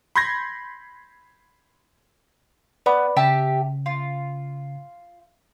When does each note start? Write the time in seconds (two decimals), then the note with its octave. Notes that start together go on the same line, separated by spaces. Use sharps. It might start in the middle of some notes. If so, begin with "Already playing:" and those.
0.15 B5 C6 G6 G#6 A#6
2.86 B3 B4 D5 B5
3.17 C#3 G4 E5 A5
3.86 F4